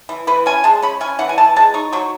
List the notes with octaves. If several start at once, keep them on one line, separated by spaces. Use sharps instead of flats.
E3
E3 B4
C#4 G#5
G#3 A5
C#4 B5
C#4 G#5
E3 F#5
G#5
E3 A5
G#3 A5
D#4 C#6
F#3 C#6